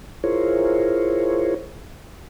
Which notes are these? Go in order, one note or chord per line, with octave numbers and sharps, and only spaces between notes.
E4 F4 G#4 A#4 C5 C#5